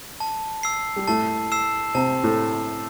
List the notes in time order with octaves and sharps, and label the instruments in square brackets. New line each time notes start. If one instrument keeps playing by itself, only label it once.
[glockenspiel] A5
E6 C7
[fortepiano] G3
[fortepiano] A2 A3 [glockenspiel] A5
[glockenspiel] E6 C7 E7
[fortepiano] C3 C4 [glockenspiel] A5
[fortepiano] A2 A3